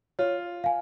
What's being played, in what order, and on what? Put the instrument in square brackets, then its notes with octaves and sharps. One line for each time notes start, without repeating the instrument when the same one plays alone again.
[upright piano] F4 [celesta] C#5
[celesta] F5 G#5